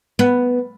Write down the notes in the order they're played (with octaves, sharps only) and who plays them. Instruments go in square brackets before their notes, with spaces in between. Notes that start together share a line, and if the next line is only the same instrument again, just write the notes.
[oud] B3